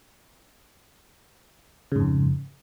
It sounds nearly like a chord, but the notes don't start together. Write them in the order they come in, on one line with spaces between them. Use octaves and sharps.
C#3 G#2 F2